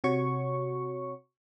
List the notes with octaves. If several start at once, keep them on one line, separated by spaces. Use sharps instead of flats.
C3 F#4 C#5 C#6